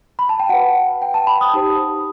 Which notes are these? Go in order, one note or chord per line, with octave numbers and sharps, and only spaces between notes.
B5
A5
G5
F#4 B4 F#5
G5
A5
B5
D#6
D#4 G4 C5